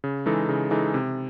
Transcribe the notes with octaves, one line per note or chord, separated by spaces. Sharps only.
C#3
E3 G#3 D#4 A4
C#3
E3 G#3 D#4 A4
C3